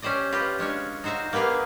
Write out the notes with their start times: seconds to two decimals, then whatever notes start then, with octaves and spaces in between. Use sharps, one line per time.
0.02 C#4 G4 C5 D5 D#5
0.32 F4 G4 B4 D#5
0.59 G#3 C#4 D4 C#5
1.04 D#4 F#4 C5 E5 F5
1.33 A#3 B3 G4 G#4 F5